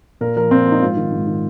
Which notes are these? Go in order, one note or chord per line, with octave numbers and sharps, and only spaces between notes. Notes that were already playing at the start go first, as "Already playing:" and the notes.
A#2 A#4
F3 A#4
A#2 C4
F3
D#4
G#2 F4
D#3
G#2
D#3